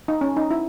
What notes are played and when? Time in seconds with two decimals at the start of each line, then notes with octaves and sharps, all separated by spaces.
0.08 D#4
0.21 C#4
0.37 D#4
0.51 E4